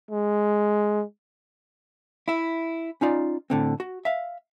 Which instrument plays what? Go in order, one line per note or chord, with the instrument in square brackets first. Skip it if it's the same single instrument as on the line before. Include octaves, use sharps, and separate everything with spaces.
[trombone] G#3
[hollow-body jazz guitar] E4 E5
C#4 D#4 F4 D5
A2 D3 C4
F#4
E5 F5